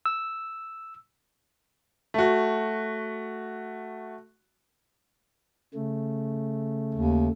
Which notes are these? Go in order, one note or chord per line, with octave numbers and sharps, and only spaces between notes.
E6
A3 F#4
C#3 A3
D#2